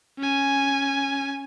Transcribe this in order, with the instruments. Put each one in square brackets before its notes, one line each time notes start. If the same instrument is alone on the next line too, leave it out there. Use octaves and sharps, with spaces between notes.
[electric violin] C#4 G#5